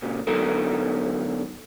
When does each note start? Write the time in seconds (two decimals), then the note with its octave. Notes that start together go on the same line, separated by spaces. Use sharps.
0.02 A#2 C#3
0.27 D3 F#3 B3 D#4 A4 A#4